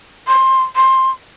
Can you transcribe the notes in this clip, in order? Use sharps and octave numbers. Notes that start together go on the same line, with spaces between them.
C6
C6